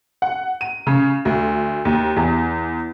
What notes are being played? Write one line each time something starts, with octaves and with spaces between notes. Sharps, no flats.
F#5
D#7
C#3
D2
D#2
E2